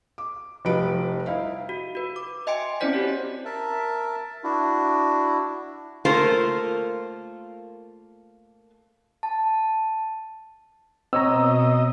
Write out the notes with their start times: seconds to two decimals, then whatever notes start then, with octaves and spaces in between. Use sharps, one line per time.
0.18 D6
0.65 F1 F3 G3 D#4 B4 D7
1.26 D#4 E4 F5
1.69 F#4
1.95 F#4 B4
2.16 D6
2.47 D#5 E5 G5 G#5 C6 D7
2.80 C4 C#4 E4 C5 D5 B6
2.93 F#4 G4 C#5
3.45 A#4 E5 A5
4.44 D4 E4 F#4
6.05 A3 A#3 F4 A4 A#4 C5
9.23 A5
11.13 B2 C4 C#5 D#5 A#5 E6